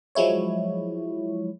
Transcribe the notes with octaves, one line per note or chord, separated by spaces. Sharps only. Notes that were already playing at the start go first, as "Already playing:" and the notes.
F3 F#3 G#3 E4 C#5